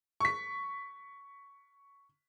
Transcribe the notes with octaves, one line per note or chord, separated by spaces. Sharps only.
C#6 B6